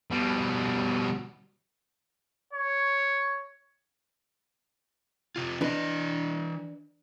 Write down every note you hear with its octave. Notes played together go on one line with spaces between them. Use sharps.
B2 G3
C#5
C3 F4
E3 D4 B4 D#5